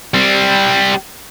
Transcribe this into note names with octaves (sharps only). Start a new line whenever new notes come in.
G3 C4